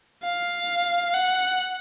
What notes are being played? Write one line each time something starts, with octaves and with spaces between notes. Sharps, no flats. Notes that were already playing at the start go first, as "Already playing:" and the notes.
F5
F#5